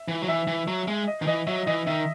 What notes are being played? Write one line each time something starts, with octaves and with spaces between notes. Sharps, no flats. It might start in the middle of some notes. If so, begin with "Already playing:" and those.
Already playing: E5
E3
F#3
E3 E5
E3
F#3
G#3
D#5
D#3
E3 D#5
F#3 E5
E3 D#5
D#3 E5